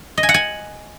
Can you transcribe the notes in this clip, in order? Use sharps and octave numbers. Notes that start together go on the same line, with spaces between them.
D#5
G#5
F#5
G#5